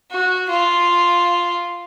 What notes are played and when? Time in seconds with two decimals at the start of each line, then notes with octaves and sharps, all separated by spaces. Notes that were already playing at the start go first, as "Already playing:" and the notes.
0.11 F#4
0.50 F4